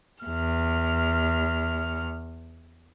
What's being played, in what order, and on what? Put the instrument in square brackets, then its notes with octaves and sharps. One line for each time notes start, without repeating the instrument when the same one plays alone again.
[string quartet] E2 F6